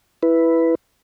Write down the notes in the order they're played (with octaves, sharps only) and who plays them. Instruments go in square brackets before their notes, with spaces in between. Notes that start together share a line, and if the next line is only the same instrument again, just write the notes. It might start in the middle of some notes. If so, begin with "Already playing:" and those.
[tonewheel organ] E4 B4